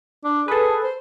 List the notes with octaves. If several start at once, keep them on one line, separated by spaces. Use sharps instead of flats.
D4
G#4 A4 B4
C5